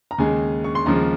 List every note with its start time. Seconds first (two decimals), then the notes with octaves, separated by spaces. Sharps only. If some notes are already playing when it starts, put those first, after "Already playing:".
0.11 A#5
0.18 D#2 C#3 G#3 G#5
0.64 C#6
0.75 C6
0.86 D#2 C#3 F3 G#3 A#5